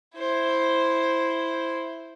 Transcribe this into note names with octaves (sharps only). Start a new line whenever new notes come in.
E4 C5